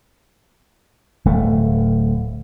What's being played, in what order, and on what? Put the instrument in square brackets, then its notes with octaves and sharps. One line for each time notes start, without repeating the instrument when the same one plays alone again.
[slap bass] D1 A3